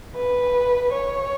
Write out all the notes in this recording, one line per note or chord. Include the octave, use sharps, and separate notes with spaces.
B4
C#5